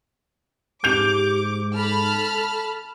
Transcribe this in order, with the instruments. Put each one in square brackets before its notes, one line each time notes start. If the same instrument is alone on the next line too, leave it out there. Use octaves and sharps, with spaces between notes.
[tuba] G#2 [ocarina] G4 [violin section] D6 [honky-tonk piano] G6 F7
[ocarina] A4 [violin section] A5 B5 F6